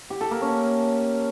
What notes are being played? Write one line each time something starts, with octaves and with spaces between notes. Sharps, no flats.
G4
A4
A#3
C#4